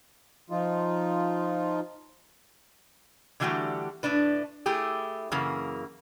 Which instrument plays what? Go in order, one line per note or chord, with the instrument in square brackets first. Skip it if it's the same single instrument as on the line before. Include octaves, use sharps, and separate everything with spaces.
[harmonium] F3 D#4 F4
[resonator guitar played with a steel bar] D3 E3 G3 A3 F#4 G4
A2 A3 D4 B4
A3 E4 G4 G#4
F#2 C#3 E3 A#3